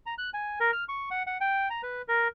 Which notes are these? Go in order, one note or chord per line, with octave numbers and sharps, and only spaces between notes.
A#5
F#6
G#5
A#4
F6
C#6
F#5
F#5
G5
A#5
B4
A#4